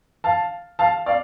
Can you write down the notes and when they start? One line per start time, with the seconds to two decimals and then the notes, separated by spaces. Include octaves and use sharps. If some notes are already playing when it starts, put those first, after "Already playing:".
0.24 F5 A5
0.79 F5 A5
1.06 D5 F5